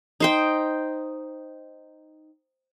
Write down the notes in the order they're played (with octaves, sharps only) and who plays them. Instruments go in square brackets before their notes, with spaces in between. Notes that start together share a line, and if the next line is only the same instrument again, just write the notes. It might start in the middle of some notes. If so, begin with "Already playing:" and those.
[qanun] D#4 C5 G5